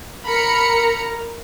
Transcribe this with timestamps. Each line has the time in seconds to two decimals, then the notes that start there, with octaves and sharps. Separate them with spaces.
0.24 A#4 A#5 B5 C#7